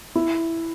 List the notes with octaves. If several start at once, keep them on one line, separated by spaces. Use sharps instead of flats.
E4